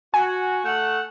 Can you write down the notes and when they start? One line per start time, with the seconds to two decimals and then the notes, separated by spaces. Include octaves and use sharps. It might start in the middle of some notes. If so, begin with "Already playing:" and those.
0.14 F#4 G#5
0.64 A3 F#5